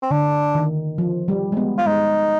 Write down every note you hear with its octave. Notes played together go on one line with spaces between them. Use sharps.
C4
D3 D4
D#3
F3
G3
G#3
B3
F4
G#3 D#4